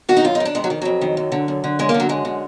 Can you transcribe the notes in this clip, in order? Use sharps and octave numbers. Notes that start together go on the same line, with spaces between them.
D#3 F#4
D#4
F#2 F4
D#4
D#3
D4
F2 G#3
F#3
D#3
F2 F#3
D#3
F#2
D3
F#2
D3
F#2 G#3
A#3
D3
F#3
F#2 G#3
D3